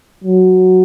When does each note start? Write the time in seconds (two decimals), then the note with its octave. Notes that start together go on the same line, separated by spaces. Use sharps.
0.24 F#3